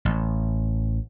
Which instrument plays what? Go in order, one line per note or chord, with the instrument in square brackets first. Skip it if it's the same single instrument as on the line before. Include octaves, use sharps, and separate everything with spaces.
[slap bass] A1